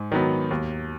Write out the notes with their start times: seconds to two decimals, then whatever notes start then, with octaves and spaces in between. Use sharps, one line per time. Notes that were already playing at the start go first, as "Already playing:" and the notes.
Already playing: G#2
0.12 D#3 F#3 B3
0.51 D#2